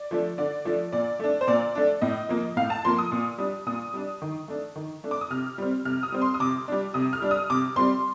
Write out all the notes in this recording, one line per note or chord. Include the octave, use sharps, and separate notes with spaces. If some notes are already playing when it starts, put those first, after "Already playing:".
Already playing: D5
F3 A3 D4
D3 D5
F3 A3 D4
A#2 D5
A3 D4
C5
A#2 D5
A3 D4
A2 D#5
F3 A#3
A2 F5
A5
F3 A#3 C6
D#6
A#2
G3 D4
A#2 D#6
G3 D4
D#3
A3 D4
D#3
A3 D4
D6
D#6
C3 F6
G3 C4
C3 F6
D#6
G3 C4
C6
D#6
C3 D6
G3 D4
C3 D#6
F6
G3 D4
D#6
C3 D6
G3 C4 C6